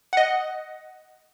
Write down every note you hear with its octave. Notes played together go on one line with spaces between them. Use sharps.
D#5 F#5